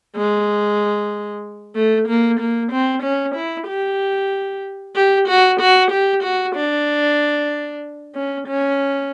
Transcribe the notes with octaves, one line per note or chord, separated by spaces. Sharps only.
G#3
A3
A#3
A#3
C4
C#4
E4
G4
G4
F#4
F#4
G4
F#4
D4
C#4
C#4